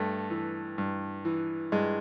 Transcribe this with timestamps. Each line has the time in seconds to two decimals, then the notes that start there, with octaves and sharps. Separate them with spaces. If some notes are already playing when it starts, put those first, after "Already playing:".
Already playing: G2 A3
0.30 E3
0.78 G2
1.25 E3
1.72 G2 G#3